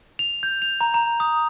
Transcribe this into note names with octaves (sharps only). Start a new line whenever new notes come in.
F7
G6
F7
A#5
A#5
D#6